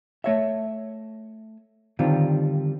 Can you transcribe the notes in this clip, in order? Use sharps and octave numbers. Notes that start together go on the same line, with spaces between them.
A3 C#5 E5
D3 D#3 G3 C4 F4